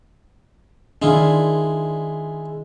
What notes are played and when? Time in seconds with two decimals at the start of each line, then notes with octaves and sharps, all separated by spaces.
1.02 D#3 G#3 D4 E4 F4